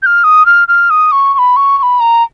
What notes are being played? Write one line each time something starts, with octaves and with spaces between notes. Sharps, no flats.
G6
F6
D#6
F6
F6
D#6
C#6
C#6
B5
C#6
C#6
B5
A#5